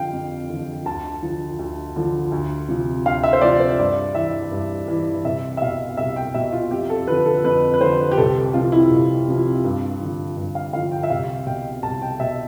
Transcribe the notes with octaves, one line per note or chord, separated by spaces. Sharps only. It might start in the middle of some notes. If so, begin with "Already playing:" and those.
Already playing: F2 D3 F3 F5 G5
F2
D3 F3
D2 A5
D3 F3
D2
D3 F3
D2
C3 F3
D2 F5
E5
C5
C3 F3 D5
C5
G2 D5
E3 E5
G2
E3
C2 E5
E5
B2 F5
C2 E5
G5
B2 E5
F4
F2 G4
A4
D3 F3 B4
A4
F2 B4
B4
D3 F3 C5
G4
C2 A4
C3 F3 F4
E4
C2
C3 F3
G2
D3 F3
G2
F5
D3 F3 F5
G5
E5
C2 F5
B2 G5
C2 A5
G5
B2 E5